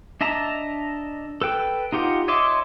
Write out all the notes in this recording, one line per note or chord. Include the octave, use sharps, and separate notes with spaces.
D4 D#5 E5 A5 A#5
A4 B4 G5
D#4 F4 G4 F#5
C#5 D#5 E5 C6 D6